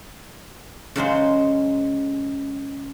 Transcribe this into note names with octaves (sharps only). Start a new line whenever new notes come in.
C#3 F#3 G#3 C5